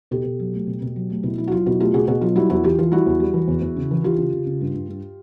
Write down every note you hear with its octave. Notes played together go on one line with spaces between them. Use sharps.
B2 G4 A4
B2
F#3
A3
B2
B2
F#3
A3
B2 E4
F#3 E4
F#4
F#3 F4
B2 E4 F#4
A3 F4 G4
B2 F#4 G#4
B2 F#4 G#4
F#3 F4
G3 E4 F#4
E2 E4 F#4
E3 F4 G4
E3 F4
G3 E4 F#4
E2
G3
E3
E2
E2
C#3
E3
E3 F4 G4
C#3
C#3
C#3
G2
G2
G2